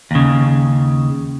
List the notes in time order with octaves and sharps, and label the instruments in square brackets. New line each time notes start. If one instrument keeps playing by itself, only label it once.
[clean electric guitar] D#2 C#3